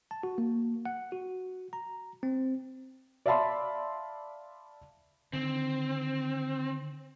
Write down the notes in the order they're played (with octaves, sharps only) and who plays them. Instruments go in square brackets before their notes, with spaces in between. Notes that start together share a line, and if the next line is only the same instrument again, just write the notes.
[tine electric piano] A5
F#4
A#3
F#5
F#4
A#5
C4
[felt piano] D5 E5 F5 A5 B5 C6
[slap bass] D3 D#3 [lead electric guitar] C4